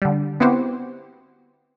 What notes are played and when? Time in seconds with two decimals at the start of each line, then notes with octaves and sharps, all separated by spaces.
0.02 D3 G3
0.40 B3 C4 E4 F#4 G4 C5